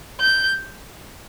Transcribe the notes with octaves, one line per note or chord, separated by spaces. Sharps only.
G6